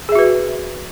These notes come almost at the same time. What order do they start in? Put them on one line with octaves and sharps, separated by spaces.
G#4 E5 F#4 B4